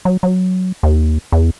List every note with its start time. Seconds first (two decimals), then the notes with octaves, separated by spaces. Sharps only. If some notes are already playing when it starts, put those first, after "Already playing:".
0.05 F#3
0.23 F#3
0.83 D#2
1.32 E2